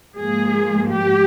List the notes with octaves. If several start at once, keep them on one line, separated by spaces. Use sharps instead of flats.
G#2 F3 A#3 G#4
G4